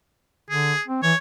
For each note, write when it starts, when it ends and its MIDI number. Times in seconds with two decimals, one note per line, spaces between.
0.50 0.73 50
0.50 0.82 68
0.87 1.01 60
1.03 1.13 52
1.03 1.17 73